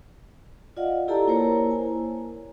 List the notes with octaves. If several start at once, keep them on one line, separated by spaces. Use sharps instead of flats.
F4 D5 D#5 F5 F#5
E4 G4 A4 D5 A5 A#5
A#3 E4 A#4 C5 C#5 A#5
G#5